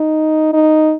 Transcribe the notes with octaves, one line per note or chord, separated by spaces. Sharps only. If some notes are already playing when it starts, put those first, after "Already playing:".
Already playing: D#4
D#4